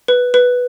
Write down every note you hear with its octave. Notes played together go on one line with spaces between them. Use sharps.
B4
B4